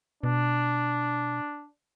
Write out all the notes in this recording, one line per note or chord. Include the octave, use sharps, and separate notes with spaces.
B2 D4